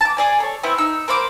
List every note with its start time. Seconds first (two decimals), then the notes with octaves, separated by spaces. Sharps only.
0.01 A5 D6
0.17 G#4 D5 G#5
0.40 A4 C#5
0.63 B3 C4 E4 E5
0.78 D#4 E6
1.08 A#3 C5 B5 D6